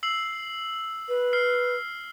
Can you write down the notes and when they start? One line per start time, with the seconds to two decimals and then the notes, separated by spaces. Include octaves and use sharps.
0.03 E6 C7 F#7
1.09 B4
1.33 F6 C7